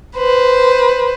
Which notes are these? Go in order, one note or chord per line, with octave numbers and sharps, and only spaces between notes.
B4 C5